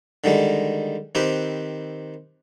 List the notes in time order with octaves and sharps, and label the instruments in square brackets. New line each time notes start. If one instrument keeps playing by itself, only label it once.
[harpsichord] D3 D#3 G3 G#3
D#3 C4 G4 B4